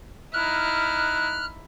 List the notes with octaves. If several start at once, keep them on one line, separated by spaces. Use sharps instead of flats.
D#4 E4 F6 F#6